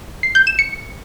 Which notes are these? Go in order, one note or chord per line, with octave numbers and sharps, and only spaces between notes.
C7
G6
E7
C#7